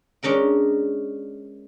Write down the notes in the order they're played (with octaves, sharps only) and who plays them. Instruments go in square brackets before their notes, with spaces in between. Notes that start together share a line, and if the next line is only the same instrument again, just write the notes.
[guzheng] G#3 C#4 D4 A#4 G5